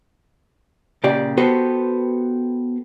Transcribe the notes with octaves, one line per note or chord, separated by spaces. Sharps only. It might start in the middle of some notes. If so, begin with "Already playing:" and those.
A#2 C#3 G4 D5
B3 F#4 G4 A4 B4 C5